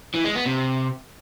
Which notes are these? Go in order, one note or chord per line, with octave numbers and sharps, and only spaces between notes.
E3
G#3
B3
C3